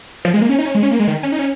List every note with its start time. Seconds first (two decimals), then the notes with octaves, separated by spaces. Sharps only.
0.25 F3
0.34 G#3
0.42 A#3
0.49 C#4
0.59 D#4
0.66 C#4
0.75 G#3
0.83 C#4
0.91 A#3
0.99 G#3
1.08 D#3
1.23 C#4
1.32 D#4
1.39 C#4